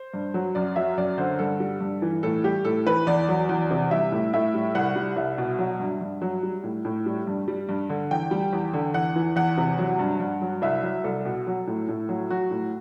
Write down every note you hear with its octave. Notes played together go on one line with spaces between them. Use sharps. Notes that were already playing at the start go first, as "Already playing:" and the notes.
Already playing: C5
G2
F#3
F#2 D5
F#3 E5
F#2 D5
D3 C5
G2 A4
G3
G2
E3
A2 A4
G3 G4
A2 A4
E3 B4
E2 D5
F#3
E2
C3
G3 E5
A2
A2 E5
G3
C2 F#5
G3
C2 E5
B2
F#3
G2
G2
F#3
G3
A2
A2
G3
G2
G3
G2
D3
E2 G5
G3
E2
D3
E2 F#5
E3
E2 F#5
C3
F#3
G2
G2
F#3
C2 E5
F#3
C2 A4
B2
F#3
A2
A2
F#3
F#3 F#4
A2